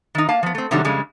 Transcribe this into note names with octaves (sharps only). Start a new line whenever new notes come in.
D#3 D#4
A#3 F5 A5
F3 B3
A3 C4
C3 D#3 F#3 G3 A3 D4
F2 C#3 G3 G#3